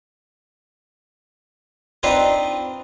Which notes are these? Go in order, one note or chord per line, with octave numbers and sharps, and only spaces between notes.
C4 D4 D#4 F4 B4 C5